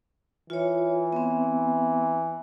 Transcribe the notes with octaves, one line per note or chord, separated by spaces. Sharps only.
E3 F4 C#5
B3 C4